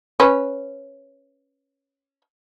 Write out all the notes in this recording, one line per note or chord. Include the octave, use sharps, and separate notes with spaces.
C#4 B4